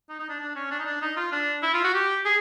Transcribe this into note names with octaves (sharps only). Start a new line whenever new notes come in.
D#4
D#4
D4
D4
C#4
D4
D#4
D4
D#4
F4
D4
E4
F4
F#4
G4
G#4